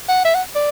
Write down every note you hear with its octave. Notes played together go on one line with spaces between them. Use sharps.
F#5
E5
F#5
D5